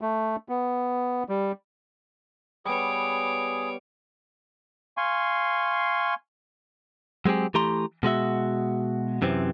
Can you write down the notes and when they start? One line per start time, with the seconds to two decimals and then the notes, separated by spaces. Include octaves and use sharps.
0.01 A3
0.49 B3
1.29 G3
2.65 G3 B3 G#4 C#5 D6
4.97 F5 G#5 C6 C#6
7.25 F#3 G#3 C4 G4 G#4
7.54 E3 A3 G4 A#5 C6
8.03 B2 G#3 F#4 E5
9.22 F#2 C3 E3 C4